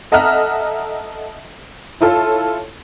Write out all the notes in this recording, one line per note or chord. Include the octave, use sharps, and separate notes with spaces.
A4 D#5 E5 F#5 A#5 F6
E4 F4 A4 C#5